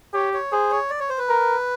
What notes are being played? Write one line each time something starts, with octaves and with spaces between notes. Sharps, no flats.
G4 C#5
C#5
G#4 C5
C#5
D5
C#5
C5
B4
A#4